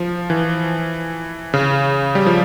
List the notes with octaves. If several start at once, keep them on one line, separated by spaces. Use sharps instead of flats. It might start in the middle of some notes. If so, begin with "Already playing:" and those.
Already playing: F3
E3
C#3
G3
F3